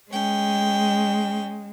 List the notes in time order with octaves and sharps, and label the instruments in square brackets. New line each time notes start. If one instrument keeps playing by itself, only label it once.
[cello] G#3 [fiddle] C#4 G5